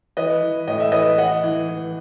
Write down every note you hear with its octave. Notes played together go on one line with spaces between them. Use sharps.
E3 B4 D#5
E3
A2 D#5
E5
E3 B4 D#5
E3 D#5 F#5
E3
E3